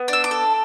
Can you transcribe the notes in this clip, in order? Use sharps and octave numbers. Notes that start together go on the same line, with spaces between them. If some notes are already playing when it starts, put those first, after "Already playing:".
Already playing: B3
D4 E6
D6
A4